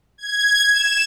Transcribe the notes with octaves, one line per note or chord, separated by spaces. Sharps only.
G#6
E7